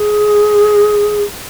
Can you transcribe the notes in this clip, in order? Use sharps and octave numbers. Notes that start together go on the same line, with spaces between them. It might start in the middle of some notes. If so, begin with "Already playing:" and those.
Already playing: G#4